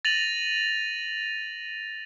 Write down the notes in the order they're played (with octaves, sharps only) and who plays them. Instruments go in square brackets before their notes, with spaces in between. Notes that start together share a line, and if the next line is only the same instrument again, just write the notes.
[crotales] A6 A#6 D#7 F7 F#7